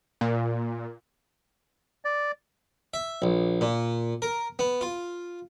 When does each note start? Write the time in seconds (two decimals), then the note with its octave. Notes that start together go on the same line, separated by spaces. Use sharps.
0.21 A#2
2.05 D5
2.94 E5
3.22 A#1
3.61 A#2
4.22 A#4
4.59 B3
4.81 F4